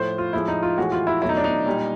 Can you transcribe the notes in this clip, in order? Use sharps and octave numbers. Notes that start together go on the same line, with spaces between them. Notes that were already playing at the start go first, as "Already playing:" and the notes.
Already playing: A2 F3 A3 C5
F4
A2 F3 G#3 E4
D#4
F4
A2 E3 G#3 F#4
F4
E4
B2 F#3 A3 E4
D#4
D4
D#4
A#2 G3